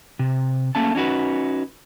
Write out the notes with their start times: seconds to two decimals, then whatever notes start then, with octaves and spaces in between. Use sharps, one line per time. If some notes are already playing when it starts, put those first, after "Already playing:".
0.19 C3
0.75 A3 A#3 C#4 A5
0.95 C#4 D#4 F#4 B4